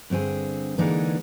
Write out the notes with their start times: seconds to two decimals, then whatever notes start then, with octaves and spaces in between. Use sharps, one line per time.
0.10 G2 D3 C4 G#4
0.78 D3 E3 G#3 A#3 D4 D#4